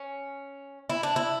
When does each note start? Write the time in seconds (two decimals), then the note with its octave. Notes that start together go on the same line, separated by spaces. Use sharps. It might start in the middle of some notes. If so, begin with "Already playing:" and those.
Already playing: C#4
0.90 E4
1.03 D4
1.16 E4